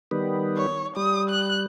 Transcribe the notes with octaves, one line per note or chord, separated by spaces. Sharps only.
D#3 G3 B3
C#5
G3 D#6
F#6